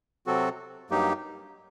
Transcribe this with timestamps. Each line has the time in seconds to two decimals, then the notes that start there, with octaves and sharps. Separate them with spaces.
0.26 C3 F#3 C4 F#4 A4
0.90 G2 F#3 A#3 D#4 G4